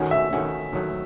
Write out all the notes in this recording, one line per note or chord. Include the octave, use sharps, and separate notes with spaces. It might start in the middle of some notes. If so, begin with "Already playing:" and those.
Already playing: D#3 A3 C#4 F#4
E5
D#3 A3 C#4 F#4
D#3 F#3 A3